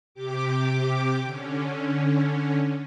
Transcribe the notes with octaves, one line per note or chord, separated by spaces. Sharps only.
C3 G4 D6
D3 C#4